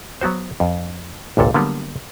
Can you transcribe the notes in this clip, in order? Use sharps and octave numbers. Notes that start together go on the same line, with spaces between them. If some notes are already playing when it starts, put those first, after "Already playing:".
F#3 B3 F#4 C5
F2
G#1 C#2 A#2 A4
D3 F#3 G3 A#3 B3